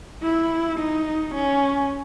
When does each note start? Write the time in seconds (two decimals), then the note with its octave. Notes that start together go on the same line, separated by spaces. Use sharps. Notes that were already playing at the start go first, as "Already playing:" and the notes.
0.22 E4
0.79 D#4
1.34 C#4